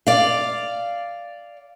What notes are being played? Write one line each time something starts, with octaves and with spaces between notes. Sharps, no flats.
D5 F5